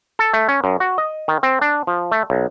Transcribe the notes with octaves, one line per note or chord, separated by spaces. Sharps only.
A4
A3
C#4
F#2
F#4
D#5
D#3
C4
D4
F3
A3
B1